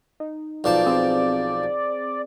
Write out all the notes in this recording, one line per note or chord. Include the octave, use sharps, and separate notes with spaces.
D#4
B1 F3 D5 A5
C4 G#4